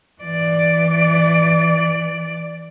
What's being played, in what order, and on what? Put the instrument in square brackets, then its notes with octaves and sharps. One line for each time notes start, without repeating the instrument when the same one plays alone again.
[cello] E3 D5